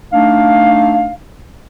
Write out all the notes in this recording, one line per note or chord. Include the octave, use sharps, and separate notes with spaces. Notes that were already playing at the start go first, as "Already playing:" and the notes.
A3 D4 D#4 F5